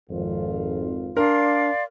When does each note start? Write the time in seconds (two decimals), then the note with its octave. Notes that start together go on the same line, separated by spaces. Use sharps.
0.10 G#1 F2 F4
1.17 D4 A#4 D5 F5 C6